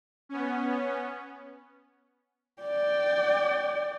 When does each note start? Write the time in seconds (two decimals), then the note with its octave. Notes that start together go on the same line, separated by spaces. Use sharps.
0.29 B3 C#4
2.62 D5 G5